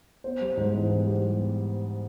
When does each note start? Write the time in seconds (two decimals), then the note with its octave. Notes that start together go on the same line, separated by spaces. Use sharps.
0.24 B3 C5
0.41 G3
0.57 G#2
0.73 E3
0.89 B3
1.06 G3